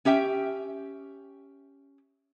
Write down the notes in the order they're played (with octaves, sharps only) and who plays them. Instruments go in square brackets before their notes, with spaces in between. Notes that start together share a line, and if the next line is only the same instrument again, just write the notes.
[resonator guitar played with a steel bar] C#4 G4 E5 G5